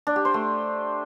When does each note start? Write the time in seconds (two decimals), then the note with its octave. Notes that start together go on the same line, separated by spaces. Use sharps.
0.07 D4
0.16 G4
0.25 C5
0.34 A3